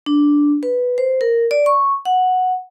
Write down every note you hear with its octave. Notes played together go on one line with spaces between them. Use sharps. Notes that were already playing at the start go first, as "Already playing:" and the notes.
D4
B4
C5
A#4
D5
C#6
F#5